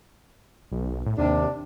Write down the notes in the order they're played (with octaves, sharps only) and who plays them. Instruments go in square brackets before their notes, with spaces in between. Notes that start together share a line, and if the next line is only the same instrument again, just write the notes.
[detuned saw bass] B1
A2
[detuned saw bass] D#2 [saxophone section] C3 D4